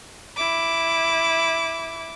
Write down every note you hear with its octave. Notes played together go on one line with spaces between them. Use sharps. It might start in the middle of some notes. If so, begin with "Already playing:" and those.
E4 D6